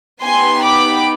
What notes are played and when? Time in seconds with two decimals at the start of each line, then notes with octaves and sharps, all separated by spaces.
0.23 B3 D#4 G4 G#5 C6
0.64 B5 D6